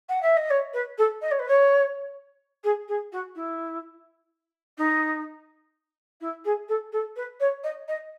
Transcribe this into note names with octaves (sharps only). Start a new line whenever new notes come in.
F#5
E5
D#5
C#5
B4
A4
D#5
C#5
B4
C#5
G#4
G#4
F#4
E4
D#4
E4
G#4
A4
A4
B4
C#5
D#5
D#5